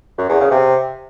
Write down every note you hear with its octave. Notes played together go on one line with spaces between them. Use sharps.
F#2
E2
C#3
C3